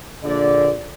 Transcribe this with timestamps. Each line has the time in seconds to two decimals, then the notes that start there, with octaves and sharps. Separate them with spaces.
0.24 A#1 D3 D5